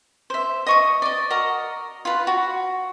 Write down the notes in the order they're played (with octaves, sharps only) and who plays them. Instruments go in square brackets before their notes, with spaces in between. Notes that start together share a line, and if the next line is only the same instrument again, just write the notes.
[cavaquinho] C5 E5
D#5 C#6 D#6
D5 D#5
F#4 A#4 D#5 A#5
F4 B4
F#4